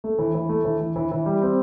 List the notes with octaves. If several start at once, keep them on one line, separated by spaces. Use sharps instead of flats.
A3
E3
E3
A3
E3
E3
E3
E3
G3
C4